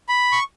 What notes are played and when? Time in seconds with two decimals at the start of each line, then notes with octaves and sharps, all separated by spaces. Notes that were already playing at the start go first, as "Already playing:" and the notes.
0.09 B5
0.32 C#6